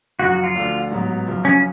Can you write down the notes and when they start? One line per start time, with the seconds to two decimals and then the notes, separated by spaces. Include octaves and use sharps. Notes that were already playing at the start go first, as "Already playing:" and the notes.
0.19 F#1 F#2 F3 F#4
0.32 F#4
0.44 F4
0.55 D2 D3 F3
0.91 A1 G#2 F#3 B3
1.26 F#1 F#2 F3
1.45 C#4